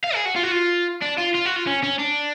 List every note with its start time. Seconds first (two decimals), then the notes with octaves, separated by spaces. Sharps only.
0.04 F5
0.15 G#4
0.25 F#4
0.36 F4
0.44 F#4
0.52 F4
1.02 D4
1.18 F4
1.34 F4
1.45 F#4
1.56 F4
1.67 C#4
1.83 C#4
1.99 D4